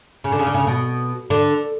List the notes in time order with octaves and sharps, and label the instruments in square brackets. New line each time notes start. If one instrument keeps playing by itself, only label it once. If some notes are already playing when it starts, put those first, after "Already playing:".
[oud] C#3
D3
C#3
D3
C#3
B2
D3